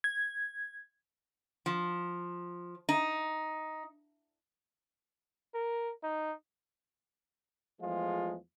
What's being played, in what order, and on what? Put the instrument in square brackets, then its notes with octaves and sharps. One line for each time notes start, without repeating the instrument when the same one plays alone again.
[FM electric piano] G#6
[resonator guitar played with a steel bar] F3
D#4
[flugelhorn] A#4
D#4
[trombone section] E2 F3 G#3 A3 F4